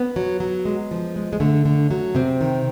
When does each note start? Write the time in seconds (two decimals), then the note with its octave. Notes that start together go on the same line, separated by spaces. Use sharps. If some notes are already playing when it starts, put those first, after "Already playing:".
Already playing: B3
0.16 F#3
0.40 F#3
0.65 G#3
0.91 F3
1.16 G#3
1.33 G#3
1.40 D3 A3
1.65 D3
1.91 F#3
2.15 C3 C4
2.41 D#3